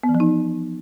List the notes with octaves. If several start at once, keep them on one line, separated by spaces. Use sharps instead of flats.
B3
E3
F3
D#4